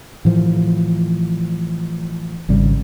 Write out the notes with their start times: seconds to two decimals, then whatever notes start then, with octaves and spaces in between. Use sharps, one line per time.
0.25 A2 E3 F3
2.49 G#1 C#3 G3